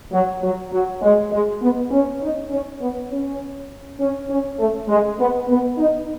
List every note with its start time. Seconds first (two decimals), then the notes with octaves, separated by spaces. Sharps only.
0.13 F#3
0.43 F#3
0.72 F#3
1.02 G#3
1.32 G#3
1.62 B3
1.91 C#4
2.22 D#4
2.51 C#4
2.81 B3
3.11 C#4
4.00 C#4
4.30 C#4
4.59 A3
4.89 G#3
5.19 B3
5.49 B3
5.78 D#4